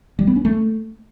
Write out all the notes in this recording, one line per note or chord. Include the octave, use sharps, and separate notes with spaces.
G3
B3
C#4
A3